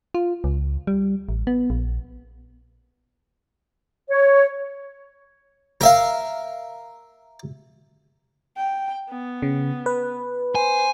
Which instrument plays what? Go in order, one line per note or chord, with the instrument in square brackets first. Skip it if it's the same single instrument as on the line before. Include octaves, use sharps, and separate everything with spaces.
[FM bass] F4
C#2
G3
A1
B3
A#1
[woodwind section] C#5
[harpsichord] A#4 E5 F5
[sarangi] G5
B3
[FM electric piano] C#3
B4
[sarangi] C5 [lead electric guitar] G#5